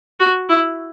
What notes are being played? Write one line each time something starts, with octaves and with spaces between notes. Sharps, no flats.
F#4
E4